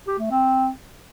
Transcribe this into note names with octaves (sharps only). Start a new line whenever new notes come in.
G4
A3
C4